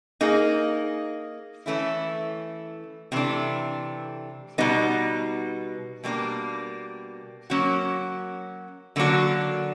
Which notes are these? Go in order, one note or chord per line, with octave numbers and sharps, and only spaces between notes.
A#3 D#4 G#4
E3 A3 C#4 E4
C3 E3 A3 D4
B2 G3 B3 D#4
B2 G3 A#3 D4
F#3 A#3 C#4 F#4
D3 F#3 A#3 D4 F#4